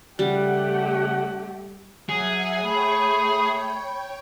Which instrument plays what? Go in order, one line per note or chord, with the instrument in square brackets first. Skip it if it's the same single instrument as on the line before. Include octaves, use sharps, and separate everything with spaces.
[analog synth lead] C#3 [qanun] G3 [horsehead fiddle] A3 G4 [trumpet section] F#5
[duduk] F#3 [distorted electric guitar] G#4 [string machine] E5 F#5
[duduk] A3 [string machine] C#5 G5 [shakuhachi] B5